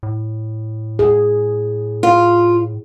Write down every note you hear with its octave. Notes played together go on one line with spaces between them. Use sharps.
A2
G#4
F4